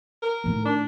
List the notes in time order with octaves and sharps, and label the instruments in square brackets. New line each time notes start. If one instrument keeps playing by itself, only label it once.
[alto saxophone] A#4
[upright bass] A2 D#3
[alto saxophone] D4